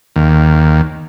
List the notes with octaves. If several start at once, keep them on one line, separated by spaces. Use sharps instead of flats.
D#2